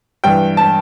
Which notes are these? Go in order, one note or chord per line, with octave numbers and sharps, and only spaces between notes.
G2 E3 G5
A5